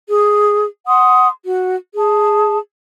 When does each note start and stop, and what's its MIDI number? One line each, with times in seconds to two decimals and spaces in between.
0.08 0.65 68
0.86 1.27 78
0.86 1.27 84
0.86 1.27 87
1.44 1.76 66
1.95 2.57 68
1.95 2.57 81